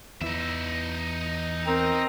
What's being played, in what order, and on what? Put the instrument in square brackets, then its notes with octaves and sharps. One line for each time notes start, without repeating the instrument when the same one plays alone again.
[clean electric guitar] E2 E3 [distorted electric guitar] D#4 E5
[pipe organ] C4 A#5 [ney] A#4